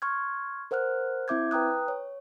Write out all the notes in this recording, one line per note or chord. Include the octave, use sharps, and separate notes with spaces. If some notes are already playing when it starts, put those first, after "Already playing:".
C6 C#6 F6 G#6
A#4 C5 F#5 F6 F#6
C4 E4 E5 D6 G6 G#6
B4 G5 A#5 D#6 F#6
C#5